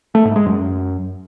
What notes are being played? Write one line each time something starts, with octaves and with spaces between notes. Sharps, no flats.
A3
G#2
G#3
F#2